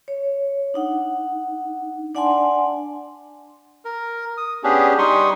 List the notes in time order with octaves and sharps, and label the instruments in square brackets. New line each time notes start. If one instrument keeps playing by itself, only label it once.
[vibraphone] C#5
D4 D#4 F#5
D4 D5 F#5 G#5 A5 C6
[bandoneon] A#4
D#6
B3 C#4 D4 G4 G#4
G3 D#4 C6 C#6 D#6